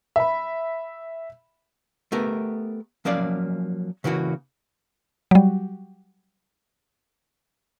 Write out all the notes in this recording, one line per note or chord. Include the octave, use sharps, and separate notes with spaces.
E5 B5
A3 B3 G4 A#4
F3 F#3 A#3 C#4 D5 F5
C#3 E3 A#3 F#4
F#3 G3